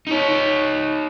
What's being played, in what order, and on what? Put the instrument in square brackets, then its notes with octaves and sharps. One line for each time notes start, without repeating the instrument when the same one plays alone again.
[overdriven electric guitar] D#4 C#5